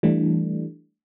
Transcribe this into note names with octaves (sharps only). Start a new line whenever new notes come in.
E3 G3 A3 D4